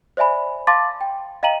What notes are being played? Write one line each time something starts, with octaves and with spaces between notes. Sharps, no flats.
C5 D5 E5 G#5 B5
F5 A5 C6 D6 A6
G5
D#5 F5 G5 A#5 D#7 F#7